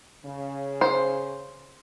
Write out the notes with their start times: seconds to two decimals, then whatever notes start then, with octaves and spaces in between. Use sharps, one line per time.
0.25 C#3
0.81 C5